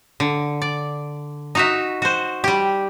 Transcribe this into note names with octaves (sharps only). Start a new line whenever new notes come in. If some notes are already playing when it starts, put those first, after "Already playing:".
D3
D5
D#4 F#4 E5
F#4 C5
G3 G4